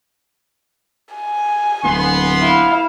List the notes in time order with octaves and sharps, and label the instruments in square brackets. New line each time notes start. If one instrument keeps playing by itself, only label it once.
[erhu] G#5
[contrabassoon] D1 [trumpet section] B3 C6
[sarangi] E4 [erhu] F5